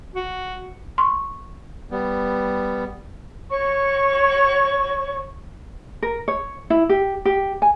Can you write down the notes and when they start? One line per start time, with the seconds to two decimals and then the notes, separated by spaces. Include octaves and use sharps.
0.15 F#4
0.98 C6 C#6
1.91 G3 B3
3.49 C#5 C#6
6.02 A#4
6.28 C#5
6.70 E4
6.89 G4
7.25 G4
7.62 G#5